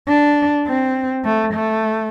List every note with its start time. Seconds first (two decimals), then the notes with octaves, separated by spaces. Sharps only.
0.08 D4
0.67 C4
1.24 A3
1.54 A3